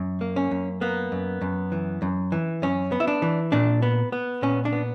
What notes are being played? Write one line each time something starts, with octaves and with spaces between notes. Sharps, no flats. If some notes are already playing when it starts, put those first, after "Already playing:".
Already playing: F#2
A#3
C#4
F#2
A#3 B3
F#2
F#2
E3
F#2
E3
F#2 C#4
B3
E4
D4
E3
A#2 D4
B3
B3
A#2 C#4
D4
B3